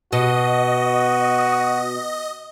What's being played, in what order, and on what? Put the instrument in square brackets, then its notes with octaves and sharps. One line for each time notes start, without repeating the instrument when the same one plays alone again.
[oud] B2 [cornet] F#4 [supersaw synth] D#5